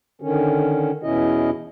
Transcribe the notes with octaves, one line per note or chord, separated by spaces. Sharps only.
D3 D#3 C#4
E2 B2 C#4 E4 D#5